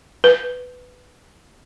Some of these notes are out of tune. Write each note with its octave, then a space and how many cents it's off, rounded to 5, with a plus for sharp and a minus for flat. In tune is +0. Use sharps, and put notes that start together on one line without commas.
B4 +10